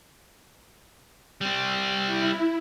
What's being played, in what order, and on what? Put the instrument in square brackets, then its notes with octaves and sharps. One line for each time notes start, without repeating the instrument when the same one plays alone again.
[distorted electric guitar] G3 C4
[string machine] E4